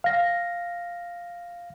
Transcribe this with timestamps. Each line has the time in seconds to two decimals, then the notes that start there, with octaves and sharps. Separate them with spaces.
0.04 F5 A#6